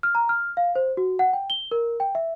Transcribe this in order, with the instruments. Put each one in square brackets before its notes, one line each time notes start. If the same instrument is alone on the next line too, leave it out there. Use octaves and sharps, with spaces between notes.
[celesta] F6
A#5
F6
F5
C5
F#4
F#5
G5
G7
A#4
G5
E5